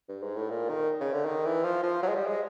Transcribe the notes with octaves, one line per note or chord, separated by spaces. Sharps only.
G2
G#2
A2
A#2
D#3
C#3
D3
D#3
E3
F3
F3
F#3
G#3
G3
G#3